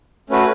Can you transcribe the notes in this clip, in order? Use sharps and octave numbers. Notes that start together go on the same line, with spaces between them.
A3 C#4 F#4 B4